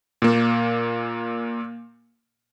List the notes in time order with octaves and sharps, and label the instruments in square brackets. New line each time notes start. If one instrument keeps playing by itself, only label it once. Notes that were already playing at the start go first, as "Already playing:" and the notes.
[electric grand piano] A#2 A#3